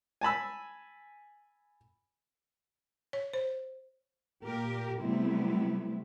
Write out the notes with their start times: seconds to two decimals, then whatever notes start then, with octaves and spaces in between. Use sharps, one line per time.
0.21 G#5 A5 B5 E6
3.13 C#5
3.34 C5
4.43 A#2 A#3 G4 A#4
5.00 C3 F#3 G3 A3 B3 E4